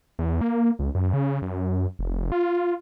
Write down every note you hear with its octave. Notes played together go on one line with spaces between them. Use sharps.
E2
A#3
C#2
F#2
C#3
F#2
F1
F4